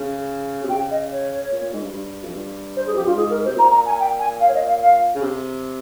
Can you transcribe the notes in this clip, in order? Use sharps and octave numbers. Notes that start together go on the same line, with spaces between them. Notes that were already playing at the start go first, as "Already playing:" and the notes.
Already playing: C#3
C3
C#3 G5
D#5
C#5
A#2
A#2
G#2
G2
G2
F2
G2
C5
G#4
F2 G4
G2 F4
G#2 G#4
A#4
C5
C3
A#2 A#5
A#5
G#5
G5
G#5
F5
C#5
D#5
F5
F5
C#3
C3